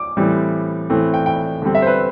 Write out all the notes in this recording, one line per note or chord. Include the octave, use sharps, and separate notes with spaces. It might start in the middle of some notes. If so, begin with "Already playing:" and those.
Already playing: D6
A2 E3 G3 C4
A2 E3 A3 C4
G5
G5
D3 G3 C4
E5
C5
B4